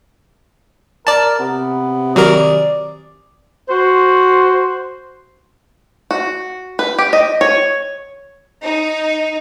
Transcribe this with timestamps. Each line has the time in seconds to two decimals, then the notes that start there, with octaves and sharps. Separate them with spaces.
1.07 A#4 D5 A5
1.40 C3 B3
2.16 D#3 F#3 G4 A#4 D5 D#6
3.69 F#4 C5
6.11 F#4
6.79 B4
6.98 G4
7.13 D#5
7.41 C#5
8.63 D#4